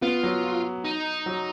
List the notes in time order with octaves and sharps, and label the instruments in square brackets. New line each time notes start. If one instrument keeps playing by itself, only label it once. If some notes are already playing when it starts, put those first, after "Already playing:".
[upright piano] B3 [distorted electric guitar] F4
[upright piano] F#3
[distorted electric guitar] D#4
[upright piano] F#3